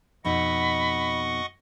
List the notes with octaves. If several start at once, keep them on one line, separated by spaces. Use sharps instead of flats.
F2 B2 D#4 D#5 F#5 B5 C#6